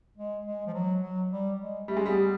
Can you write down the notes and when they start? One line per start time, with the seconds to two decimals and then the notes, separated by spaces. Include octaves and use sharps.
0.17 G#3
0.45 G#3
0.67 F3
0.74 F#3
1.02 F#3
1.32 G3
1.60 G#3
1.88 G3 A3
1.97 G#3
2.06 G3 B3